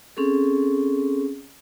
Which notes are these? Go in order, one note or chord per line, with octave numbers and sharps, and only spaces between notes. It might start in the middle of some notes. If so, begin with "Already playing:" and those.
C4 C#4 G#4 A4